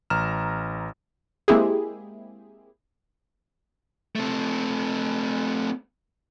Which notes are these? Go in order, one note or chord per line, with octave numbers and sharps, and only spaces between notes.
A1 A#5 F6 E7
G#3 A#3 C4 E4 G4 G#4
A3 C4